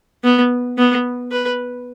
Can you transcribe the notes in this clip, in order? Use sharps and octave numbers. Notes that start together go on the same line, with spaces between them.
B3
B3
B4